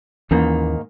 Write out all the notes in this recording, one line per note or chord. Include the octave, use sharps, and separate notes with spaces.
D#2 G#2 D#3 E3 A#3 C#4